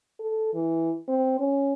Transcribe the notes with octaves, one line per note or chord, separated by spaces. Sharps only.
A4
E3
C4
C#4